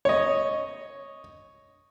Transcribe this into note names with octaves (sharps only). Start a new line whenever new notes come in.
C#5 D#5